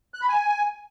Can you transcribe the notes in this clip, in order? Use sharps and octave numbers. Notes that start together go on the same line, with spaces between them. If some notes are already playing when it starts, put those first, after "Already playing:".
F#6
B5
G#5